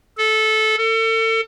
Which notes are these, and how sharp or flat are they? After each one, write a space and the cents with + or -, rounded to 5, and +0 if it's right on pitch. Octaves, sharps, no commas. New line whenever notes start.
A4 -15
A4 +35